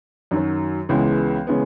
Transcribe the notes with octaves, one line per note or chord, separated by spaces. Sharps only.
F#2 D#3 F#3
C#2 C#3 E3 G#3 B3
C#3 E3 G#3 B3